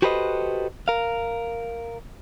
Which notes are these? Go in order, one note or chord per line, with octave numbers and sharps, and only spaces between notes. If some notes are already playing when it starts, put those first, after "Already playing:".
F#4 G4 A4 B4 C5 D#5
A#4 F5